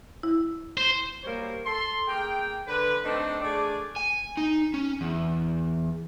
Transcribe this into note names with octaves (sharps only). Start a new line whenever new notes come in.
E4
C5
F#3 G3 A#3 C5 C#5
A4 C6
A#3 G#4 G5
D3 B4
A3 C4 D4 D#4 A4
A3 D4 G#4 D5
G#5
D#4
C#4
E2